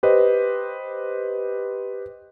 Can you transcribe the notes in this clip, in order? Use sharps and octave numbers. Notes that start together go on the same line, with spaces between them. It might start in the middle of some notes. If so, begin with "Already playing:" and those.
G4 B4 C5 D#5